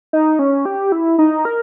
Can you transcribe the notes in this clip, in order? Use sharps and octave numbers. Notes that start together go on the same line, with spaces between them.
D#4
C#4
G4
E4
D#4
A#4